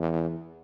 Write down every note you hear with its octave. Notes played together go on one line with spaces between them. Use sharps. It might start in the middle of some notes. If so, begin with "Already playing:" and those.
Already playing: E2